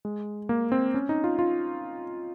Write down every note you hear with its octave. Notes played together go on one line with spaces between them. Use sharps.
G#3
A#3
C4
C#4
D#4
F4
F4